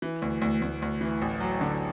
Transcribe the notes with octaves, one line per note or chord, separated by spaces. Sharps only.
E3
D2
D2
D2
D2
E3
A1
F#3
D3